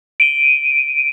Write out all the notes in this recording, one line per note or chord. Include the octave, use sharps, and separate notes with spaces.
D7 D#7